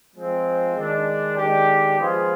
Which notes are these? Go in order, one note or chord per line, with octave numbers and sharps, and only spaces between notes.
F3 G#3 C4
D#3 G#3 D4
D#3 G#3 D4 G4
F3 G#3 B3 F4 G#4